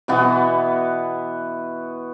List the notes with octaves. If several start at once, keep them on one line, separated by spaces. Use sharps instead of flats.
B2 E3 B3 F#4